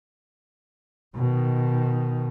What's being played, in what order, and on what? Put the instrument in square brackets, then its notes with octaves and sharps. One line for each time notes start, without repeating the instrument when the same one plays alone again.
[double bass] B2 D#3